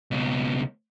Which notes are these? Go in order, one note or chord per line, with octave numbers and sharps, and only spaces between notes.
C#2 B2